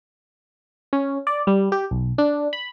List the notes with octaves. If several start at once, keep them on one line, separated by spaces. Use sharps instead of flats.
C#4
D5
G3
G4
B1
D4
B5